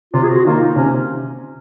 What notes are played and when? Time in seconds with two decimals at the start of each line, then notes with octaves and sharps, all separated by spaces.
0.14 C3 F4
0.23 G#4
0.29 F#4
0.45 D#3 A#3 F4
0.60 D#4
0.76 C3 C#4